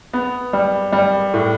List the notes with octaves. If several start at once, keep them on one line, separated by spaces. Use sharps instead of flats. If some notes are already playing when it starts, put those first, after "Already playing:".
B3
G3
G3
A2